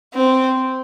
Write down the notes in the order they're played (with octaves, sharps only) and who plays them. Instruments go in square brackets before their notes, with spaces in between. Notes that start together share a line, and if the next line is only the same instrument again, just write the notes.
[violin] C4